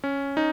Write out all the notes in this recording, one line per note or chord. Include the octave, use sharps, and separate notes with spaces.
C#4
D#4